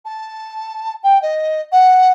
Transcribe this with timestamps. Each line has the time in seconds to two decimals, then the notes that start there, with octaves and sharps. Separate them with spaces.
0.05 A5
1.03 G5
1.22 D#5
1.72 F#5